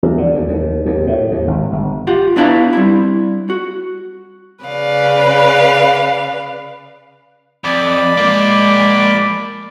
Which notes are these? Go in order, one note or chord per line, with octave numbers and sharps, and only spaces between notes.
E2
D3
D2
D#2
D#2
A2
D#2
G#1
G1
F4 G4 F#5
B3 D4 E4 B4 F5 A#5
G3 C4 E4
F#4
C#3 B4 D5 F5
F2 D5 B5
F3 G#3 A#3 D6